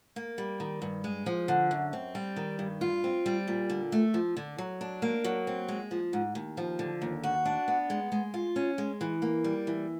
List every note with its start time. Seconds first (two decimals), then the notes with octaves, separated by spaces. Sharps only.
0.16 A#3
0.38 G3
0.60 D#3
0.82 G2
1.04 G#3
1.26 F3
1.48 D3
1.71 F#2
1.93 C4
2.15 G3
2.36 D#3
2.59 G2
2.81 F4
3.04 C4
3.26 G3
3.48 A#2
3.70 D3
3.92 A3
4.14 F3
4.37 D3
4.58 F#3
4.81 D4
5.02 A#3
5.24 F#3
5.47 C4
5.68 G#3
5.91 F3
6.13 G#2
6.35 D#2
6.57 F3
6.79 D3
7.02 D#2
7.23 F#4
7.46 D4
7.68 B3
7.90 G#3
8.12 G#3
8.34 F4
8.56 C#4
8.78 G#3
9.01 E3
9.22 A#3
9.44 G3
9.67 E3